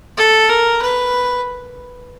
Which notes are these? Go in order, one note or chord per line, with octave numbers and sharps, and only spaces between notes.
A4
A#4
B4